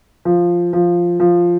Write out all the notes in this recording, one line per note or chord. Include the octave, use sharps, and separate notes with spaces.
F3
F3
F3